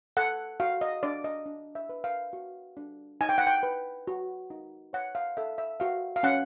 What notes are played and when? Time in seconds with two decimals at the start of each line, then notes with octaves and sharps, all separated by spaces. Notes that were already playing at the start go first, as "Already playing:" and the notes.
0.17 A4 F#5
0.60 F#4 F5
0.81 D#5
1.03 D4 D5
1.24 D#5
1.46 D4
1.75 E5
1.89 B4
2.04 F5
2.33 F#4
2.77 D4
3.21 D#4 G#5
3.29 G5
3.38 F#5
3.47 G5
3.63 B4
4.08 F#4
4.50 D#4
4.93 C#5 F#5
5.15 F5
5.37 A4 E5
5.58 E5
5.80 F#4 F5
6.16 F5
6.23 C#4 F#5